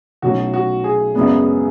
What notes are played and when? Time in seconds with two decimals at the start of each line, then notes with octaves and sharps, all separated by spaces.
0.22 B1 A2 F#3 C#4 F#4
0.53 F#4
0.84 G#4
1.15 F#2 C#3 G#3 B3 D4